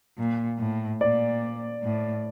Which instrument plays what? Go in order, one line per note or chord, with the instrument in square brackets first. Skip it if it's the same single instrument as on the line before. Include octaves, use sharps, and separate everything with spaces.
[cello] A#2
A2
[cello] A#2 [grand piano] D5
[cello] A2